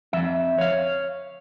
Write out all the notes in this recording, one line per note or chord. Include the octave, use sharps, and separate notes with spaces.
F2 E5
C#5 F5